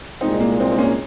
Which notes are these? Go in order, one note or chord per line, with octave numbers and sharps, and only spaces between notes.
C2 A#2 G#3 C4 D#4
A#3
C4
C4
A#3 C#4